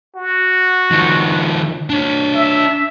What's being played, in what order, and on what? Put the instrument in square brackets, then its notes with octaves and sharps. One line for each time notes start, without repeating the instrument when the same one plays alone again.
[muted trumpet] F#4
[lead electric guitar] D#3 F3
D4 C#5
[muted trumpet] E5